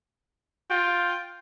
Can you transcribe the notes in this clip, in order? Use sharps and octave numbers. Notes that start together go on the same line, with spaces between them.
F4 G5